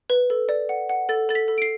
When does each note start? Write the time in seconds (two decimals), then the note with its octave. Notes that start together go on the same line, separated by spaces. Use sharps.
0.10 B4
0.30 A4
0.49 D5
0.69 F#5
0.89 F#5
1.09 A4 A6
1.29 A4 A6
1.35 B6
1.48 A4
1.58 D7
1.62 C7